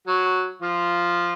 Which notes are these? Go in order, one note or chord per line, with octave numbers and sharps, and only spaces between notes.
F#3 F#4
F3 F4